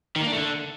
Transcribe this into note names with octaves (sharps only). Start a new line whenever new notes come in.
D#3
A#3
D4
A3
D3